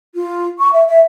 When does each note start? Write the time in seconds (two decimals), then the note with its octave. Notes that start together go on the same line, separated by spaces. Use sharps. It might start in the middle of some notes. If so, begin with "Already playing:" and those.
0.15 F4
0.59 C#6
0.72 E5
0.87 E5